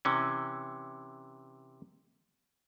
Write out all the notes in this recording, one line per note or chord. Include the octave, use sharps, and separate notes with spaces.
C3 E3 C#4